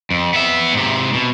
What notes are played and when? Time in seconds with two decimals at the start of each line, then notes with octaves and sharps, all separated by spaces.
0.10 F2
0.33 B3 E5
0.73 G#2 C3
1.13 B2